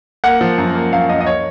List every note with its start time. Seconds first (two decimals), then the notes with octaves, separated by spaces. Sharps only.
0.24 A#3 F#5
0.41 F3
0.58 F#2
0.75 A#3
0.92 F#2 F5
1.09 F#2 D#5
1.21 D#5
1.26 C#5